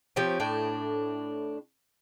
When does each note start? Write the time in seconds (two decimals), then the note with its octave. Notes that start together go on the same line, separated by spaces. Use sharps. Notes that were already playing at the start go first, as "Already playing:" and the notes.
0.16 F3 C4 G4 C#5
0.40 A2 D4 G5